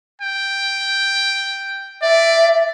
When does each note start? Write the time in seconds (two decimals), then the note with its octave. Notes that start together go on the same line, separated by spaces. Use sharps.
0.22 G5
2.02 D5 E5